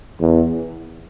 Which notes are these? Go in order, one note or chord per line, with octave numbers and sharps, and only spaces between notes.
E2